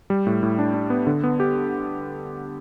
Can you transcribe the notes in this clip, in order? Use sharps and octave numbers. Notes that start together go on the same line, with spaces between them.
G3
A2
A2
D4
D4
B3
D3
B3
G4